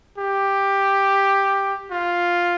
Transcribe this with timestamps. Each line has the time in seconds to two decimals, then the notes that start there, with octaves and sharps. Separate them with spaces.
0.18 G4
1.91 F4